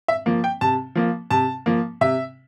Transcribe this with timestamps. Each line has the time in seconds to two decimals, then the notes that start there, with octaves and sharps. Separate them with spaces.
0.08 E5
0.26 F3 A#3
0.44 G5
0.61 C3 A5
0.95 F3 A#3
1.31 C3 A5
1.66 F3 A#3
2.01 C3 E5